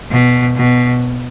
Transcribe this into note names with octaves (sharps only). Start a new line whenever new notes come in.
B2
B2